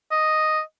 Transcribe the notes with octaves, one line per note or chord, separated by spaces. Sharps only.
D#5